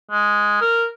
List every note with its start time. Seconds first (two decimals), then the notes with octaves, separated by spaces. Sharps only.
0.11 G#3
0.61 A#4